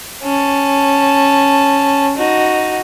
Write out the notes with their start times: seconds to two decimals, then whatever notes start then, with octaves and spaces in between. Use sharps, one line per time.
0.23 C#4 A5
2.17 D#4 F#4